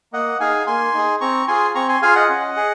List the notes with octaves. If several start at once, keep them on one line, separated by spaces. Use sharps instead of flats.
A#3 D#5 F#5
D#4 G#4 F5 G#5
A#3 G#5 C6
D#4 G#4
C4 A#5 C#6
F4 G#4 G#5 C6
C4 A#5 C#6
G#5 C6
F4 G#4 F5 G#5
D#5 F#5
C#4
G#4